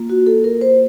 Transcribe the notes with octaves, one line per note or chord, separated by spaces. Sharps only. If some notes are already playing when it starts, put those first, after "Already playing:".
Already playing: A#3 F4
F#4
A4
A#4
C5